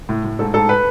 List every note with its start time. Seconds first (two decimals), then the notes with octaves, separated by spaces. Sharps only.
0.09 A2
0.24 A2
0.39 G#2 A4
0.54 G#2 A4
0.69 B4